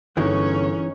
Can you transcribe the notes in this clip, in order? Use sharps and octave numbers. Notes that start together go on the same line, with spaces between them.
G1 E3 G#3 C#4 D#4 C#5